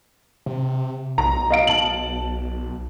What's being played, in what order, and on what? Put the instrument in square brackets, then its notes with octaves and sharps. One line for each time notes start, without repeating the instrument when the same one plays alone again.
[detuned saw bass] C3
[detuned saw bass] B1 [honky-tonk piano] A#5
[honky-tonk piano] D#5 F5 D7
A5 F#7